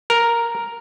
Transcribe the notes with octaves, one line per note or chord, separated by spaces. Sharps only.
A#4